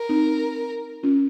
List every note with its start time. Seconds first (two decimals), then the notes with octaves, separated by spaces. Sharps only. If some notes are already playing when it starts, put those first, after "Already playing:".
Already playing: A#4
0.09 C4 D#4
1.03 C#4 F4